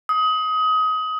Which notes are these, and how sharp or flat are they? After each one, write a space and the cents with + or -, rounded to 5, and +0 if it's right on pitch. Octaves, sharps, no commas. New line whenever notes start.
D#6 +25